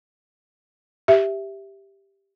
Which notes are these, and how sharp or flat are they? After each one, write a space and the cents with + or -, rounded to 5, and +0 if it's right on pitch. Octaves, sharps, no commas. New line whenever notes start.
G4 +0 E5 +0